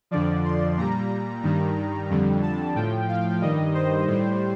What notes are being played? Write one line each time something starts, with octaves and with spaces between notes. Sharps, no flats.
F2 D3 F3 D5
C6
A#2 G3 A#5
G2 D#3 G3
F2 D3 G3
A5
A2 F3 G5
F5
G2 D#3 G3 D#5
C5
A2 G3